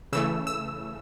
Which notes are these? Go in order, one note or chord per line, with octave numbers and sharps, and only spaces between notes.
C#3 E3 A3 E6
E6